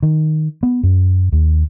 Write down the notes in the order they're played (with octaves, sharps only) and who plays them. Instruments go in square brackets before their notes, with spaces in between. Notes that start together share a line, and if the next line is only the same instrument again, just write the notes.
[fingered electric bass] D#3
B3
F#2
D#2